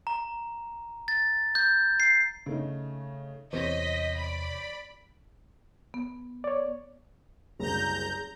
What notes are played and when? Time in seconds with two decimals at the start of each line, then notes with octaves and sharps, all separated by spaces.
0.07 A#5
1.08 A6
1.55 G6
2.00 C7
2.46 C#3 A3 D#4
3.53 E2 C3 C5 C#5 D#5 B6
4.17 D5 B5
5.94 B3
6.44 C#5 D5
7.59 F#1 C2 G#4 A#5 G6